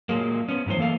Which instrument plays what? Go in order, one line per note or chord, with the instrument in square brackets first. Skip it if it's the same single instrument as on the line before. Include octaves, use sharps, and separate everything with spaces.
[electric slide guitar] A#2 F#3 G#3 A#3
B3 C#4
G2 E3 F#3 G#3 C5
E3 A#3 A4 F5